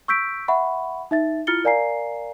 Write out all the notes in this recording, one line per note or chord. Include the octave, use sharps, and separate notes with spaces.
C#6 E6 G6 B6 D7
E5 F#5 B5 C#6
D#4 E5 A6
E4 F4 F6 A6 C#7 G7
A#4 D5 F5 G#5 A#5 C7